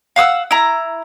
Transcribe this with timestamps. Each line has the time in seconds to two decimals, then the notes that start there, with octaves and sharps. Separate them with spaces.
0.16 F5 F#5 D6 E6
0.51 E4 A#5